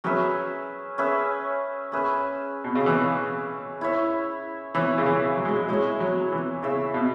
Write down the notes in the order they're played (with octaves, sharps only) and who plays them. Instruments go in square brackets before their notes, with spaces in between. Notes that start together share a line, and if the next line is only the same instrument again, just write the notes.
[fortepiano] F#3 [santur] C#4 G#4 B4 E5
[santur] C#4 G#4 B4 E5
C#4 G#4 B4 E5
[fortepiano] B2
C#3
[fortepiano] E3 [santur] C#4 G#4 B4 E5
[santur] E4 C#5 E5
[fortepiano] E3 [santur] E4 C#5 E5
[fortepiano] C#3
E3
F#3
G#3
F#3
[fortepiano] G#3 [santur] E4 C#5 E5
[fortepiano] F#3
E3
[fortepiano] C#3 [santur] E4 C#5 E5
[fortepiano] B2